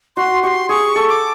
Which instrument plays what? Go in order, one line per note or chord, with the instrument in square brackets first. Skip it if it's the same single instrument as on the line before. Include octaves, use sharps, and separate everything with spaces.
[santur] F#4 [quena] C6
[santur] G4 [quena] C#6
[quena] C6
[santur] G#4 [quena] C#6
[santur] A4
[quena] D6